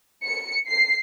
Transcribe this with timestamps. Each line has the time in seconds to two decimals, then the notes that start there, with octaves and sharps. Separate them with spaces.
0.24 C#7
0.68 C7